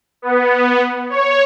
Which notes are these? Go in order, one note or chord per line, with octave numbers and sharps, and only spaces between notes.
B3
C#5